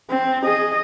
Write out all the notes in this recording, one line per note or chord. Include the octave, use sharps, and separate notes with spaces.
C4
G#4 D#5